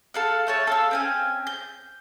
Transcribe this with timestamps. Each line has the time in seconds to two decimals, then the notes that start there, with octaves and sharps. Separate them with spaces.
0.14 A4 F5 F#5
0.47 A3 C#5 A5
0.67 A4 F5 E6
0.91 C4 C#4 G#5
1.47 G6